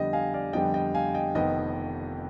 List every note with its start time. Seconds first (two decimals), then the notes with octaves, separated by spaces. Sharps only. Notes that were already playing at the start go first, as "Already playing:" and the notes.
Already playing: F2 D3 G3 B3 D#5 G5
0.13 F5 G#5
0.34 D5 F5
0.53 F2 D3 G3 B3 D#5 G5
0.74 D#5 G5
0.95 F5 G#5
1.14 D#5 G5
1.35 F1 F2 D#3 B3 D#5 G5